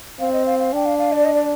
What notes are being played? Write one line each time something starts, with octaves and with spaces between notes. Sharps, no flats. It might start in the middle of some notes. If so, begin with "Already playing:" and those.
C4 F5
D#5
F5
F5
D4 G5
F5
F5
D5
D#5
D5